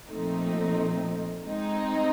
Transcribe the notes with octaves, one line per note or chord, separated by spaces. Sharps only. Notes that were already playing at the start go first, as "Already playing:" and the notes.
A#2 F3 A3 C4 D#4
G#3 C4 D#4